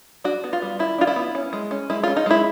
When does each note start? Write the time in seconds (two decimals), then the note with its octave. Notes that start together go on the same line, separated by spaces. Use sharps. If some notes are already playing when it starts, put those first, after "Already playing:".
0.24 D4 F#4
0.44 B3
0.53 F4
0.62 G3
0.79 D#3 E4
0.98 D4 F4
1.07 E4
1.16 B3
1.35 C#4
1.53 G#3
1.71 C#4
1.90 G#3 E4
2.03 C#4 F4
2.17 D#4
2.26 G#3 E4